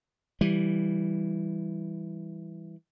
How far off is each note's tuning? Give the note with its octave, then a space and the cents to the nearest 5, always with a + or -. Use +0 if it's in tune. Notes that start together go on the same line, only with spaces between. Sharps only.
E3 +0 G3 +0